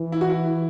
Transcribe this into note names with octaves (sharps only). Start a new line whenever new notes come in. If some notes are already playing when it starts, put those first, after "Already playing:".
Already playing: E3
E4
F#4
E4